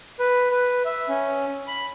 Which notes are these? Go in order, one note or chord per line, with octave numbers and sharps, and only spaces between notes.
B4
B4
E5
C#4
B5